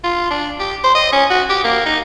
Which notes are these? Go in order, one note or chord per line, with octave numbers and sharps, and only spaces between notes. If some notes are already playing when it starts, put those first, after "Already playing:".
F4
D4
G4
C5
D#5
C#4
F#4
G4
A#3
D#4